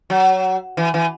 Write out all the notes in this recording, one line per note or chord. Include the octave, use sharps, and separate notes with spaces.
F#3
E3
E3